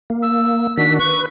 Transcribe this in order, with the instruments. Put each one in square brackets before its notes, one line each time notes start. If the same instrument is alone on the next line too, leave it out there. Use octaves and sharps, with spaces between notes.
[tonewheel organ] A#3
[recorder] E6
[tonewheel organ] D#3 D4 F#4 [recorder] B6
[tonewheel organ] B4 [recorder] C#6